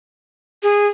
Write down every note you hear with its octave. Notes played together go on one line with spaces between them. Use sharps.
G#4